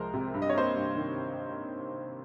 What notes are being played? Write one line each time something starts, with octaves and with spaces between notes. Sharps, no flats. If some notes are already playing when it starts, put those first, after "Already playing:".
Already playing: C2 F3 G#3 A#4 C5
C3
G2
D#5
C#5
A#3 C5 D#5
G2
D#3